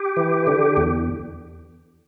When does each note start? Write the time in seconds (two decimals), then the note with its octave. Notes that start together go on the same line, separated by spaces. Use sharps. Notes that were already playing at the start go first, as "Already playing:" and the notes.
Already playing: G4
0.16 E3
0.47 D3
0.77 E2